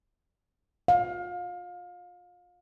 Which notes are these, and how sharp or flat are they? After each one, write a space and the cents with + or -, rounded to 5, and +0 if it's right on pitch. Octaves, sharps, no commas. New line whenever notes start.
F5 +30